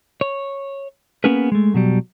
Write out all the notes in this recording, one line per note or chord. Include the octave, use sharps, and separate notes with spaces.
C#5
A#3 B3 C#4 G#4 A#4 B4
G#3 A3
B2 F#3 G3